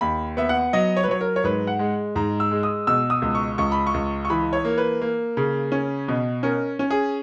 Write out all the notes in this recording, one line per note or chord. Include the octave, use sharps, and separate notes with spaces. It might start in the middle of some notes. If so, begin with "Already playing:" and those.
D#2 B5
B3 E5
F#5
F#3 D#5
C#5
B4
F#3 C#5
A#4
C#5
G#2 B4
F#5
G#3
G#2 A#5
E6
G#3
D#6
B2 E6
D#6
C#2
C#6
C#2 C#6
B5
C#6
C#2
C#6
E3 B5
C#5
A#3
B4
A#3
C#3
C#4
B2
C#4 A#4
C#4
G#4